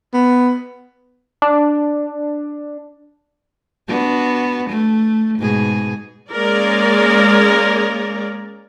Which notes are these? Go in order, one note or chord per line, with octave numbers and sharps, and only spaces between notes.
B3
D4
B3 D4 F#4
A3
G#2 B2 G#4
G#3 A#3 C#4 A#4 D5